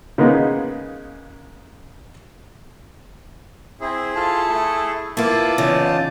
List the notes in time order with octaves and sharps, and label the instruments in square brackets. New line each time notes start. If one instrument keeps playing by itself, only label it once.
[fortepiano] C#3 G#3 A#3 B3 D#4
[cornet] C4 [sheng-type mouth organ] E4 G#4
[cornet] F4 [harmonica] A4
[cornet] A3
[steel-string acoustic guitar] A#3 B3 [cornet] E4 [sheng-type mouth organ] F4 A5 [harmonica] D6
[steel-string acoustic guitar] E2 C#3 D#4